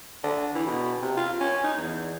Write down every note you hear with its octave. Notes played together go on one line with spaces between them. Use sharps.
D3
E3
B2
C3
F4
C#4
D#4
E2